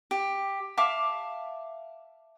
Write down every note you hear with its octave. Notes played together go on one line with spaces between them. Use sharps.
G4
E5 F5 A5 D6